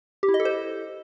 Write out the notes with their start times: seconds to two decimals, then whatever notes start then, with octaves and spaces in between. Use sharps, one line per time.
0.23 G4
0.29 E4
0.34 D#5
0.40 A4
0.45 C5